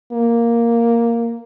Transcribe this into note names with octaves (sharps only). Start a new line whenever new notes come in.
A#3